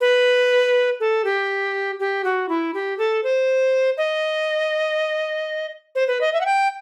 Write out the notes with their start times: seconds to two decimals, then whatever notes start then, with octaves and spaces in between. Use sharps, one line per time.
0.01 B4
1.00 A4
1.25 G4
2.00 G4
2.24 F#4
2.49 E4
2.74 G4
2.98 A4
3.24 C5
3.97 D#5
5.95 C5
6.08 B4
6.21 D#5
6.33 E5
6.41 F#5
6.46 G5